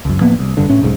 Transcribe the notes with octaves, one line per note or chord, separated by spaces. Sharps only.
C#2 F#2
A2 F3 A#3 B3
C2
F1 G2 D3
A2 C#4
F1 B1 G#2